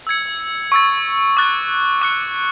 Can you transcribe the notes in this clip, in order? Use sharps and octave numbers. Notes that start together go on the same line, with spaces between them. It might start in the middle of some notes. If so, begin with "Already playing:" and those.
E6 G#6 C#7
C#6 E6 A6
D6 F#6 A6
D6 F#6 C#7